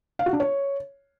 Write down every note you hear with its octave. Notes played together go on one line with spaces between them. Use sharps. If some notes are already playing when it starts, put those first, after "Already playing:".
F5
F#4
D4
C#5